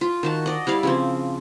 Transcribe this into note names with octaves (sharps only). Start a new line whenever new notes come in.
F4
D#3 F#4 A5
D5 D#5
G3 E4 D5 F5
C#3 F3 C4